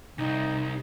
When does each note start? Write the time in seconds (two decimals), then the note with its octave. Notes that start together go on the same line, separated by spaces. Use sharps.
0.18 C2 D#4